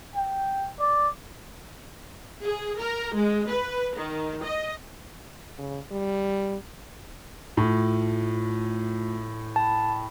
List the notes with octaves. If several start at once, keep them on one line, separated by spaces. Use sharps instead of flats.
G5
D5
G#4
A#4
G#3
B4
D#3
D#5
C#3
G3
A2 A3 F4
G5 A5 B5